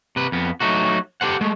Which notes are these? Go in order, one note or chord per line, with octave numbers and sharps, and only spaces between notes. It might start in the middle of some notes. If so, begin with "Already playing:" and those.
C3 B4
F2 B3
F#3 A3 D#4 F#4
G4 A4 C5 F#5
G#3 A3